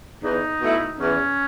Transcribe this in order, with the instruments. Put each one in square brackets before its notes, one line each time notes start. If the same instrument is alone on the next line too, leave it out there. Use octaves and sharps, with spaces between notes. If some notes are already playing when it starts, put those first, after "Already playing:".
[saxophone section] E2 [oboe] D#4
[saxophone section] B2 A3 E4
[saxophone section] E2 [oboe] C#4